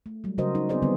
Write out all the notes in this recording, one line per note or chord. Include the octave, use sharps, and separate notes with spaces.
A3
F#3 G3
C#3 F#3 F#4 A#4 C5 D#5
D#4
B3 C4 G#4 C5 D5 D#5
D3 D#3 G3 B3 C4